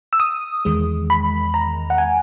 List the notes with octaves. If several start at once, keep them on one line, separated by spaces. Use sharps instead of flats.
E6
D#6
E2 D#3 G#3
B5
A#5
F#5
G#5